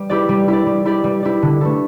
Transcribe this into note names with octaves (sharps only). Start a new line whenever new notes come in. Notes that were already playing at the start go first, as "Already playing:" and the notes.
Already playing: G3
E4 G4 D5
G3
E4 G4 D5
G3
E4 G4 D5
G3
E4 G4 D5
D3
A3 E4 A4